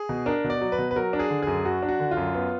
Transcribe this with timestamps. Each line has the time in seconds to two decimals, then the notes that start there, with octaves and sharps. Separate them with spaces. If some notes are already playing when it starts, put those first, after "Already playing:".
Already playing: G#4
0.09 B2
0.26 D4 A#4
0.44 B2
0.50 D5
0.61 F#3
0.72 B4
0.78 B2
0.91 B4
0.96 F#3 A#4
1.13 D4
1.19 G#4
1.30 D3
1.42 F#2 G#4
1.65 F#3 F#4
1.82 D4
1.89 F#4
2.00 D3
2.11 F4
2.17 F#2
2.34 B3